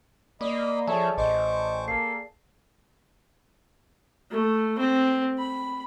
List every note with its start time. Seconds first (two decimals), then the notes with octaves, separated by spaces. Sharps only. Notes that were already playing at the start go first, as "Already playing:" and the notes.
0.41 A#3 D5 D#5 B5
0.87 F3 G#4 A4 C#5 E5 A5
1.18 A1 C5 D#5 C#6 D6
1.88 A#3 A4 C7
4.31 A3
4.78 C4
5.39 B5